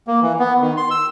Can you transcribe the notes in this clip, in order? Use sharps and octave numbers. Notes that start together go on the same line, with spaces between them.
A#3
E3
B3
D#3
C6
E6